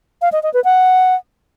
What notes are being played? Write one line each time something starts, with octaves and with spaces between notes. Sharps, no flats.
F5
D#5
D#5
B4
F#5